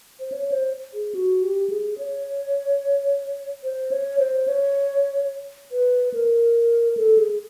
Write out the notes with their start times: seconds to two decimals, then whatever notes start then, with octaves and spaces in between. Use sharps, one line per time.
0.20 C5
0.32 C#5
0.52 C5
0.94 G#4
1.15 F#4
1.43 G4
1.70 G#4
1.98 C#5
3.64 C5
3.91 C#5
4.19 C5
4.48 C#5
5.72 B4
6.14 A#4
6.97 A4
7.18 G#4